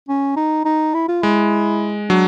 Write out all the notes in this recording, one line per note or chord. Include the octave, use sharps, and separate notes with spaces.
C#4
D#4
D#4
E4
F4
G#3 E4
F#3 D4